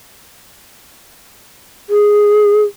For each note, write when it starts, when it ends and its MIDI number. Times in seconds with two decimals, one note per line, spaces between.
1.90 2.62 68